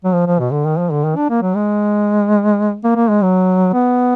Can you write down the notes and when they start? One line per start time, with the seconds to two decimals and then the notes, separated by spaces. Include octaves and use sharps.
0.05 F#3
0.14 F3
0.27 F3
0.39 B2
0.52 D3
0.65 D#3
0.78 F3
0.91 D3
1.04 D#3
1.16 D4
1.30 A#3
1.42 F#3
1.56 G#3
2.84 A#3
2.96 A#3
3.10 G#3
3.23 F#3
3.73 B3